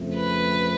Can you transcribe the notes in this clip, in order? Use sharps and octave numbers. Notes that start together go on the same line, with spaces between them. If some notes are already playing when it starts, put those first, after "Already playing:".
Already playing: F2 C#3 F3 A3 C4
B4